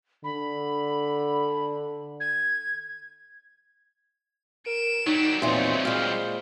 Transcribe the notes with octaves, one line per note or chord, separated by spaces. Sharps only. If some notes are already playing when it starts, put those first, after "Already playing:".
D3 B5
G#6
A#4 D7 E7
F#3 G3 D#4
E2 A#2 C4 D#4 C#5 C6
A#2 G#3 C5 F6